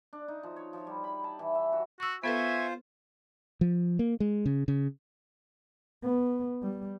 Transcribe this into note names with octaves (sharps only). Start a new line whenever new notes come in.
D4
D#4
F3
C#5
F3
G3
B5
A5
E3
E5
F#4
F#4 C#6 E6
B3 F4 A4 B4 C5 E5 G#5 C#6
F3
A#3
G#3
C#3
C#3
B3
G3